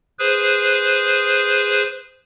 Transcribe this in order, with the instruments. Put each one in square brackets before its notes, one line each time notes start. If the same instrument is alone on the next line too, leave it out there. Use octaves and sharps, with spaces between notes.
[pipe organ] G#4 B4 C5